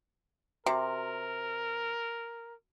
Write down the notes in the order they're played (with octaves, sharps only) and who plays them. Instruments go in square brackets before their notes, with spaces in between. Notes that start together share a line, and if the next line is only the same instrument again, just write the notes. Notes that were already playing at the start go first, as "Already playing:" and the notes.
[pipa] C3 [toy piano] F#4 C6 [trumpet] A#4